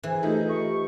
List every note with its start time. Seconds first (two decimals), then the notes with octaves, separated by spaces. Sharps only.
0.03 E3 G#4 C5
0.23 A3 D#4 F4 G4
0.49 C#6